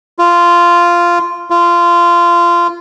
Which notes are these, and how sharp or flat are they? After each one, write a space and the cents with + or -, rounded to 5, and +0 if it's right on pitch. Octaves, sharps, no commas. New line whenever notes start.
F4 -10
F4 -20